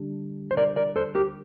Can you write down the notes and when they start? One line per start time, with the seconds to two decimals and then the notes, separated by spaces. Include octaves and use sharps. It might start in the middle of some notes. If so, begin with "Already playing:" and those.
Already playing: D3 G3 D4
0.51 C5
0.57 A#4 D5
0.76 A#4 D5
0.96 A4 C5
1.15 G4 A#4